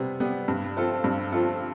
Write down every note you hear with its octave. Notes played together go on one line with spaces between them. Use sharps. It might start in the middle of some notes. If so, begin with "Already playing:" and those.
Already playing: C3 G3 B3
G3 B3
G2
F3 C4 F4 A4
G2
F3 C4 F4 A4